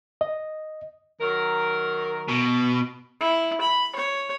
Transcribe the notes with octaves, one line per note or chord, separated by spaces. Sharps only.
D#5
D#3 F#3 A#4
B2
E4
B5
C#5